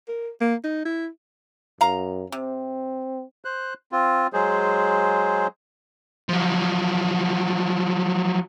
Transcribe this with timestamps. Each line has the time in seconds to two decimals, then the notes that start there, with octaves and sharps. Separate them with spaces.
0.08 A#4
0.41 A#3
0.64 D#4
0.85 E4
1.81 F#2 F5 A#5
2.32 C3 C4
3.45 C5 F#6
3.92 C4 F4
4.33 F#3 G#3 G#4 C5
6.29 F3 F#3